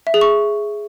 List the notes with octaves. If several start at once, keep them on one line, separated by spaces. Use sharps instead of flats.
E5
G#4
C#6